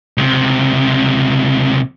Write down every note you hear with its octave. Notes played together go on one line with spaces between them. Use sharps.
C#2 C3